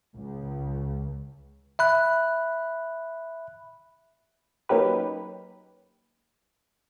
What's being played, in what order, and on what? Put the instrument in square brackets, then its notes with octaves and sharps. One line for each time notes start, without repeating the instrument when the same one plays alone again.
[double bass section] C#2
[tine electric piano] E5 B5 F#6
[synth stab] F#3 A#3 C#4 D#4 G4 B4